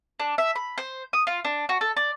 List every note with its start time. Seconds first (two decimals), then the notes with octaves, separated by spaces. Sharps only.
0.20 D4
0.38 E5
0.55 B5
0.78 C5
1.13 D#6
1.27 F4
1.45 D4
1.69 F#4
1.81 A4
1.97 D5